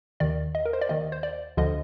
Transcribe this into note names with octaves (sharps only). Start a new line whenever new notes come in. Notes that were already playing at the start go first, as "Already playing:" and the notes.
D#2 D#3 D5
D#5
A#4
C5
D5
D#2 D#3 D#5
C5
D5
D2 D3 F3 D#5